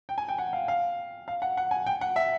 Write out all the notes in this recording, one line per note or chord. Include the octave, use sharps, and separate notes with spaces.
G5
G#5
G5
F#5
F5
F5
F5
F#5
F#5
G#5
G5
F#5
E5